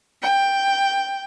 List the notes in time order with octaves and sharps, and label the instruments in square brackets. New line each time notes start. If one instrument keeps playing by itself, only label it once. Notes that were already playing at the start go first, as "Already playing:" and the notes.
[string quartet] G5